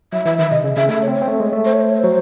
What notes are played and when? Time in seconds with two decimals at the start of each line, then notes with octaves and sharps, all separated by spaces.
0.13 F#3 E5
0.25 E3 E5
0.38 D#3 E5
0.51 C3 D#5
0.64 C#3
0.77 C#3 E5
0.89 A3 E5
1.02 C#5
1.07 C4
1.15 C#5
1.22 C4
1.27 A3
1.40 G#3
1.52 A3
1.65 C5
1.73 C#5
1.81 C5
1.90 C#5
1.97 C5
2.04 F#3